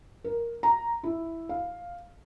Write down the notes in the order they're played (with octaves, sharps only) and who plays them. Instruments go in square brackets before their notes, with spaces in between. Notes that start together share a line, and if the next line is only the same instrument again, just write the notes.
[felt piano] A#4
A#5
E4
F5